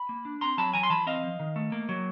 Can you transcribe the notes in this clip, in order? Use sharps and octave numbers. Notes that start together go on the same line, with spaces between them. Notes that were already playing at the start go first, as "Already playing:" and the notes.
Already playing: B5
A#3
D4
C4 A#5 C6
F#3 A5 B5
E3 G#5 A#5
C6
E3 A5 B5
C4 D#5 F5
F3
D#3
A3
A#3
F#3